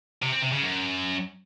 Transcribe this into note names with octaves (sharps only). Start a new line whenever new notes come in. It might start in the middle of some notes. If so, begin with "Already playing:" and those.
C3
C4
C3
C#3
F#2